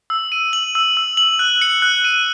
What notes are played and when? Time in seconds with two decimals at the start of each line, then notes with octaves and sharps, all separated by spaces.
0.10 E6
0.32 D#7
0.53 F#7
0.75 E6
0.97 E6
1.17 F#7
1.39 F#6
1.62 C#7
1.82 F#6
2.04 D#7